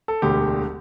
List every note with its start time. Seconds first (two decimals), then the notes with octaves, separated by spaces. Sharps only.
0.08 A4
0.22 E1 D2 D3 G4